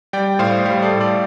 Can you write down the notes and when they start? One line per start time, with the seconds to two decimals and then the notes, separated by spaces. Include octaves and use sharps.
0.13 G3 D5 G5
0.39 A2 C5 F5
0.66 G3 C5 F5
0.82 A4 D5
0.92 A2
1.00 A4 D5